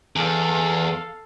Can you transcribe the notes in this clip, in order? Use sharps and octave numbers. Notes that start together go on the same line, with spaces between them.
E2 A4 F5